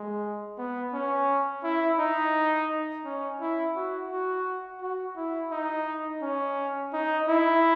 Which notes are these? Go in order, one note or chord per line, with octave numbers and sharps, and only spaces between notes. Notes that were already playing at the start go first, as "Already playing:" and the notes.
Already playing: G#3
B3
C#4
E4
D#4
C#4
E4
F#4
F#4
F#4
E4
D#4
C#4
D#4
E4